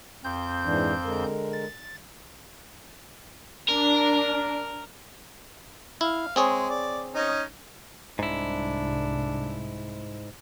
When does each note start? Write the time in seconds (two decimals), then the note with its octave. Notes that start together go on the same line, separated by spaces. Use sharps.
0.24 F2 C4 G6
0.65 G#2 E3 D4
1.05 D3 G#3 A#4
1.53 A6
3.69 D4 A#4
6.01 E4 F5
6.36 G#3 C4 G#4 C#5
6.70 D5
7.15 C#4 D#4 D#5
8.19 C2 G#2 D4 E4